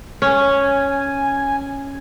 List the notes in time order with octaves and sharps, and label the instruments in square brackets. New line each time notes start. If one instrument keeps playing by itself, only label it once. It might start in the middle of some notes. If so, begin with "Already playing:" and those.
[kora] C#4 [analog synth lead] G#5